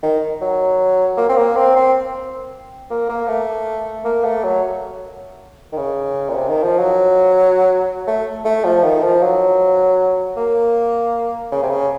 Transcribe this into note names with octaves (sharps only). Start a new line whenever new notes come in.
D#3
F#3
A#3
C4
A#3
C4
C4
A#3
A#3
A3
A#3
A3
F#3
D#3
C#3
A#2
C3
D#3
F3
F#3
A3
A3
F3
D#3
F3
F#3
A#3
C#3
C3
C#3